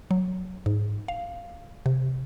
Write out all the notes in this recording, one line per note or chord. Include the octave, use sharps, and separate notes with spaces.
F#3
G#2
F5
C3